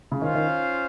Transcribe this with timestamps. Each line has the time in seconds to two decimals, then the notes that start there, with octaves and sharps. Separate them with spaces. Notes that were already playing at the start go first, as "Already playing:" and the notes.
0.12 C#3
0.21 D#3 C#4 F4 C5 F5
0.35 D#3